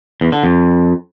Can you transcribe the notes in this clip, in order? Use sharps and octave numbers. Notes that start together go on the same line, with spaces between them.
E2
D3
F2